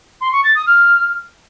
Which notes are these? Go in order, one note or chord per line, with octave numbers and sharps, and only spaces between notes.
C6
C#6
A6
D#6
F6